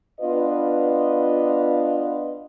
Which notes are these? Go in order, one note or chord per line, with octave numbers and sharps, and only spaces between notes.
B3 D4 F4 B4 D#5 F5